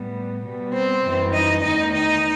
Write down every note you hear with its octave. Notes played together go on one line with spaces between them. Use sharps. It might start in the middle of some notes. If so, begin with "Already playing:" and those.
Already playing: A2 G3 B3
B2 G3 B3
C4 C5
F#2 E3 G3
D#4 D#5
E2 D#3 A3 D#4 D#5
D#4 D#5